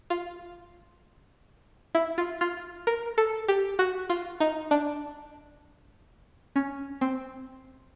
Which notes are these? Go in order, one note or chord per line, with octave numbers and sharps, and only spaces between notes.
F4
E4
F4
F4
A#4
A4
G4
F#4
F4
D#4
D4
C#4
C4